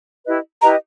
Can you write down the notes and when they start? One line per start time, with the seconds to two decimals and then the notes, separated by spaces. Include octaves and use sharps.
0.25 E4 G4 B4 D#5
0.62 E4 G4 B4 D#5 A#5